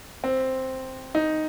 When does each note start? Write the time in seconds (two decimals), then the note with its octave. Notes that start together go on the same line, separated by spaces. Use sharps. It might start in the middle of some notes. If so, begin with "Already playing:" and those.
0.24 C4
1.15 D#4